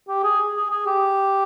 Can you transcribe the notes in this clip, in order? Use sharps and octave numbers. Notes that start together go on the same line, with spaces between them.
G4
G#4
G#4
G#4
G4